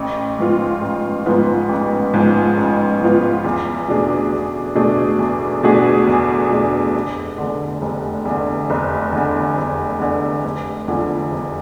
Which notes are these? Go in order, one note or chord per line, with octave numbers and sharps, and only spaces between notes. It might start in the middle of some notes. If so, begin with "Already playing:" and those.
Already playing: A1
G#2 F3 B3 F4
A1
G#2 F3 B3 F4
A1
G#2 F3 B3 F4
A1
G#2 F3 B3 F4
E2
B2 A3 D4 G#4
E2
B2 A3 D4 G#4
E2
B2 A3 D4 G#4
E2
B2 A3 D4 G#4
F1
E2 D3
F1
E2 D3
F1
E2 D3
F1
E2 D3
F1
E2 D3 F3
F1